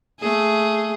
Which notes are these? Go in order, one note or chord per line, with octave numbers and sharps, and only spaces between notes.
A3 G#4